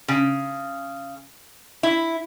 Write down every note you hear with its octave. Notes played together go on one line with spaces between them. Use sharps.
C#3
E4